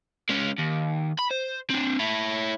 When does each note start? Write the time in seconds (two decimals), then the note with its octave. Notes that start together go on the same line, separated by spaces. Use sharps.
0.30 G#3 C#4
0.59 D#2
1.19 B5
1.31 C5
1.71 C4 D4
1.99 E4 C#5